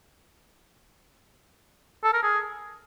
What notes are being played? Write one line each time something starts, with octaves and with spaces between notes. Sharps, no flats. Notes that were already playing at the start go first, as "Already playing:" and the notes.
A4
A#4
G#4